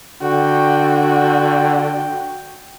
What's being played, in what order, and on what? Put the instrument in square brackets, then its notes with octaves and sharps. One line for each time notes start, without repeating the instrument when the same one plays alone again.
[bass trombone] D3 [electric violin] F#4 [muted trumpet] G5